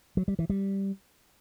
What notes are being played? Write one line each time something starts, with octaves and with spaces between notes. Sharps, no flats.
F#3
G3
E3
G3